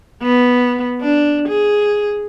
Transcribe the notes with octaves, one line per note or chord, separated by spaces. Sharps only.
B3
D4
G#4